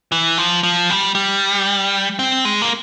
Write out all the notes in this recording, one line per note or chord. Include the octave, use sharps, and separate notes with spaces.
E3
F3
F3
G3
G3
C4
G#3
A#3